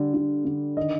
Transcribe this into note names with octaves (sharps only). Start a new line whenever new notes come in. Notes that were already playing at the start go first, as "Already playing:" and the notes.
Already playing: D3 G3
D3
D3
D#3 D#5